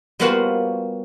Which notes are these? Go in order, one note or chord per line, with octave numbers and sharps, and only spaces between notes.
G3 A#3 B3 F4 F#4 C5